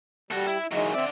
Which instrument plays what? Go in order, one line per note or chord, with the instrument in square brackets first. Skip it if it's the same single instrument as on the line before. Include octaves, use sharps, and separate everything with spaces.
[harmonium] G3 [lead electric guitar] F#4 A4
[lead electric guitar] E4
[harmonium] D#3 G#3 [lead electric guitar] E3 F#3
[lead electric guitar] D3 D5 [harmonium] C4 E5